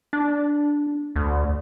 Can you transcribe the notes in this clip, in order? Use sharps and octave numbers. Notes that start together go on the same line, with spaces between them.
D4
D2